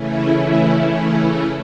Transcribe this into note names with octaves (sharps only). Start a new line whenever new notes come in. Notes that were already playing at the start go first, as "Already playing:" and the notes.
Already playing: C#3 E3 A3 C#4 E4